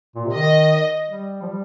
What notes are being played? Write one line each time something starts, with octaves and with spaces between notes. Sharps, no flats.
A#2
C3
D#3 D#5
G3
F3
G3